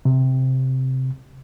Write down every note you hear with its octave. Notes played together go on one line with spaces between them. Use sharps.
C3